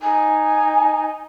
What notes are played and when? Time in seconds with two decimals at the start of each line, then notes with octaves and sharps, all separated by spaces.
0.01 D#4 G#5